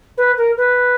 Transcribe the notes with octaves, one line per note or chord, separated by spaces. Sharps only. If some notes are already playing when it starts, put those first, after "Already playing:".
B4
A#4
B4